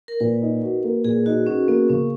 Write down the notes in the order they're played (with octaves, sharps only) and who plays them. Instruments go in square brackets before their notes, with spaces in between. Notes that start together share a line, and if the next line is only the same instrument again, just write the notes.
[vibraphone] A#4
[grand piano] A#2 [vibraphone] B4
[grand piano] D#4
F#4
A#3
[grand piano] A#2 [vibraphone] G#4
[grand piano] D#4 [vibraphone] F#4
[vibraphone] C#4 [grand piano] F#4
[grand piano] A#3 [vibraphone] B3
[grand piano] C#3 [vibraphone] C#4